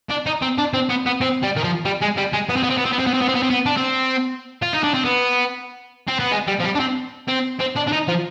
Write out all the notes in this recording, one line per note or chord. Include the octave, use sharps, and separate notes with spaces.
D4
D#4
C4
D4
C4
B3
B3
C4
G3
D#3
F3
G3
G#3
G3
G#3
B3
C4
B3
C4
B3
C4
B3
C4
B3
C4
B3
C4
B3
C4
B3
D4
C4
F4
D#4
D4
C4
B3
C4
B3
G#3
G3
F3
G3
D4
C4
C4
C4
D4
D4
D#4
F3